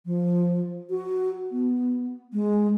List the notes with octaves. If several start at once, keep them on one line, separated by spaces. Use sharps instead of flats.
F3
F#4
B3
G#3